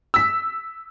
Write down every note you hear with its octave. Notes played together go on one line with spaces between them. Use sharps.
E6 B6